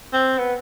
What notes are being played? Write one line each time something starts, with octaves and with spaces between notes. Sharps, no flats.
C4
B3